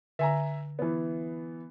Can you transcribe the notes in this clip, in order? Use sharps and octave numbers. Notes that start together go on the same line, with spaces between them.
D3 E5 G#5 A#5
E3 B3